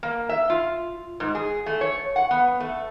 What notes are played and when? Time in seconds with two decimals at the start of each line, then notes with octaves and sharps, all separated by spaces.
0.03 A#3
0.29 E5
0.50 F4
1.20 G#2
1.35 G#4
1.66 A3
1.81 C#5
2.16 F#5
2.31 B3
2.60 A3